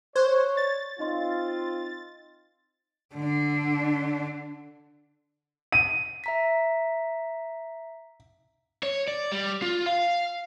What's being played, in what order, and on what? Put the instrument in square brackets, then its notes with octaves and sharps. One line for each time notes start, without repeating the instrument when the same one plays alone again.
[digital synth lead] C5 [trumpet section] C#5 [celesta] C#6 F#6 G#6
[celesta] D5 [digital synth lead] A6
[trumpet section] C4 F4 [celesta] D#4 D#5 C6
[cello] D3 D4
[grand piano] D#7
[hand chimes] E5 A#5 B6
[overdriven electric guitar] C#5
D5
G3
F4
F5